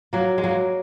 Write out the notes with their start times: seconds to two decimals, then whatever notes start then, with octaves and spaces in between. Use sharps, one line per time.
0.13 F#3 A#3
0.38 G#3
0.44 F#3 A#3